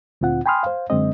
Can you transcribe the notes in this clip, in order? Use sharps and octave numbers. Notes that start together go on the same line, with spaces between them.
D2 A#2 C4 F4 F#5
G5 G#5 B5 C6 D#6 F6
C5 F5
F#2 D3 G#3 C4 D#5